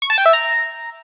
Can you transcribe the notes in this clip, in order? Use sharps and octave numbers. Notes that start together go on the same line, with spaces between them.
C#6
A5
G5
E5
A#5